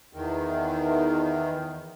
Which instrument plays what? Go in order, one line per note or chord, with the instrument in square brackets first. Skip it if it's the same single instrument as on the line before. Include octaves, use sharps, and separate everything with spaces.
[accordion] E2 D#3